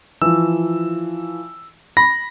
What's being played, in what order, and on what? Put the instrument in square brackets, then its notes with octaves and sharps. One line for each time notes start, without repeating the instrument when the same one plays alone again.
[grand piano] E3 F3 [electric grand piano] E6
[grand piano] B5 [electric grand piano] A#6